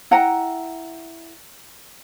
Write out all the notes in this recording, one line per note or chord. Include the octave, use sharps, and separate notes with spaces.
E4 F#5 G5 A#5